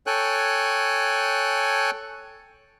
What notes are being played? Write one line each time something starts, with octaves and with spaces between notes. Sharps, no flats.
A4 C#5 G5 G#5 F#6